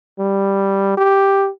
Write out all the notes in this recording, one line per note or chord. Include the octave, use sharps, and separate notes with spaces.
G3
G4